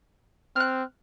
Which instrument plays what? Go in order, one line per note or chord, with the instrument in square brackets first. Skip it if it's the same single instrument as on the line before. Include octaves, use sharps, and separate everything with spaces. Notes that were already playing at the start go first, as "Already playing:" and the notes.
[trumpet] C4 [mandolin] F6 F#6